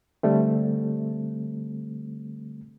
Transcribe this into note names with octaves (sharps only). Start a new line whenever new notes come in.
D3 G3 A3 C4